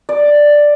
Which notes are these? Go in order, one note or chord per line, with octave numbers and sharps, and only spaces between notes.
D5